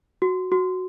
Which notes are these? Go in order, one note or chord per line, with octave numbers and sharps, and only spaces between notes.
F#4
F#4